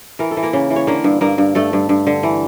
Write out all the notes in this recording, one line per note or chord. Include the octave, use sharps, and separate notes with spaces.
E3 A#4
A4
E3
A#3 A#4
C#3
E3
C#5
D3 A#3 A#4
G2
G2 A#3 A#4
G2
G2 A3 A4
G2
G2
D3
E3